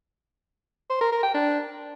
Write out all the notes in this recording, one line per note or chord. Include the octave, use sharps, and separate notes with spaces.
C5
A#4
A#4
G5
D4